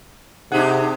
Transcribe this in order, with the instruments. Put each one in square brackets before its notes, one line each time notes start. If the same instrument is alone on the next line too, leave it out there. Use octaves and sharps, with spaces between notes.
[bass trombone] C3 [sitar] D4 G4 G#4 [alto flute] D#4 [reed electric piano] F#5